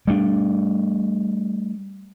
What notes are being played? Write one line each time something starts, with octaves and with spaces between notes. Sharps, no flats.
G3 A3 B3 D4